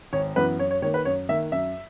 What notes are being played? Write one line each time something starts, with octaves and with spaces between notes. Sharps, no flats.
G#1 C#5
F#2 E3 B3 B4
F#2 C#5
C#5
D#3 A#3 C#5
B4
F#2 C#5
D#3 A#3 E5
F#2 E5